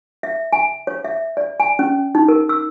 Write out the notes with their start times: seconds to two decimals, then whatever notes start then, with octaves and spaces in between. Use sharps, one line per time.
0.23 E5
0.53 G#5
0.87 C#5
1.05 E5
1.37 D5
1.60 G#5
1.79 C#4
2.15 D#4
2.28 A#4
2.49 E6